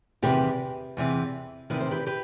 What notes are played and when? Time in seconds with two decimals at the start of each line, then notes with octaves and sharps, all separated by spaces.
0.22 E2 C3 D#3 G4 B4
0.97 E2 C3 E3
1.70 E2 C3 D#3 B4
1.80 C5
1.91 G4 B4
2.07 G4 B4